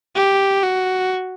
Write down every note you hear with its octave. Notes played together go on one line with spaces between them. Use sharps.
G4
F#4